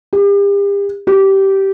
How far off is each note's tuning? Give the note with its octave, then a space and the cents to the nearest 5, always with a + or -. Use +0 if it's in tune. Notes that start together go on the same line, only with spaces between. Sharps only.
G4 +40
G4 -15